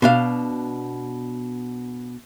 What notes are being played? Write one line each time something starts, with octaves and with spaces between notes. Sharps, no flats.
B2 D4 F5